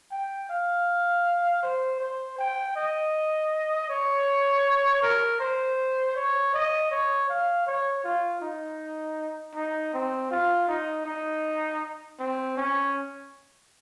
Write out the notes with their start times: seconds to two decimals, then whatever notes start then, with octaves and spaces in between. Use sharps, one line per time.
0.12 G5
0.49 F5
1.63 C5
2.00 C5
2.39 G5
2.76 D#5
3.90 C#5
5.02 A#4
5.40 C5
6.16 C#5
6.54 D#5
6.91 C#5
7.29 F5
7.67 C#5
8.04 F4
8.42 D#4
9.55 D#4
9.94 C4
10.31 F4
10.69 D#4
11.06 D#4
12.19 C4
12.57 C#4